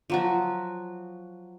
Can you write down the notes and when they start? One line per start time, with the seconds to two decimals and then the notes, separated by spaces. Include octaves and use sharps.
0.10 F3 F#3 F#4